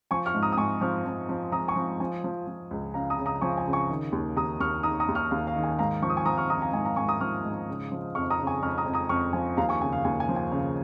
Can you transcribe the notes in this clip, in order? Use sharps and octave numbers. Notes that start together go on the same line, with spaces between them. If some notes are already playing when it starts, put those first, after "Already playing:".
F3 G#5 C#6
C#6 F6
G#2
A#5 D#6
D#6
G#2 G#5 C#6
F3 C#6 F6
F3
F3
F3 A#5 D#6
G#5 C#6
F3
F3 G#5
F3
F3
C#2
C#3 F5 A#5
A#5 D#6
C#3
A#5 D#6
F3 G#5 C#6
G#5
C#3
G#5 C#6
D#3
D#2
D#2 A#5 D#6
D#2 C#6 F6
D#3 A#5 D#6
A#5 D#6
D#2
C#6 F6
D#2 F5
F5
D#3
G#5
G#2 F5 A#5
F3 C#6
D#6
G#5 C#6
F3 A#5 D#6
C#6 F6
F3 A#5 D#6
F5 A#5
G#2 G#5
F5 A#5
G#2 G#5 C#6
A#5 D#6
F3 C#6 F6
G#2
C#3
F3
F2 C#6 F6
A#5 D#6
C#3
G#5 C#6
F2 C#6 F6
A#5 D#6
F2
A#5 D#6
F2 C#6 F6
F3 G#5
D#2 F5 A#5
G#5 C#6
C#3 G#5
F5
D#2 G#5
G#5
F3
G#5
C#3 F5